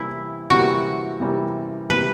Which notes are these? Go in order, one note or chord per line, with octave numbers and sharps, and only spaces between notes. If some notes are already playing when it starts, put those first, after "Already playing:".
Already playing: C3 E3 G3 A#3 E4
C3 E3 G3 A#3 F#4
C3 E3 G3 A#3
C3 E3 G3 A#3 B4